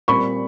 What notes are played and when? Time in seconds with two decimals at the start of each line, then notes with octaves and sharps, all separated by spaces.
0.08 A#2 G3 C4 B5 C#6